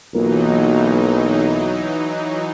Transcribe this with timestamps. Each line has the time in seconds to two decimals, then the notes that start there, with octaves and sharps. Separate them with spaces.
0.15 B1 E3 F#3 A#3 D#4 F4 A#4